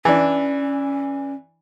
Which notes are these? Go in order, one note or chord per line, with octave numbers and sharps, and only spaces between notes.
E3 C#4 D4